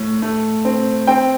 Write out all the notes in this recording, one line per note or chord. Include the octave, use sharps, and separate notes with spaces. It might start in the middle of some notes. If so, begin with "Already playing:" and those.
Already playing: A2
A3
C4
C4 G5